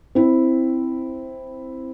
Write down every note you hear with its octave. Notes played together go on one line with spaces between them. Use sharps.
C4 E4